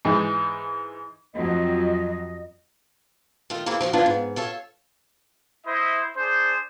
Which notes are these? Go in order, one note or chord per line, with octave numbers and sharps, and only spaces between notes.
G#2 E3 D#4
F2 F#3 D#5
D#3 A3 F4
E3 G#3 A#3 C4 E4 F4
F3 F4 F#4
E3 F3 B3 D4 E4 F4
G#2
F4 A4 C#5 E5
E4 C5 D#5 E5
D4 G#4 C5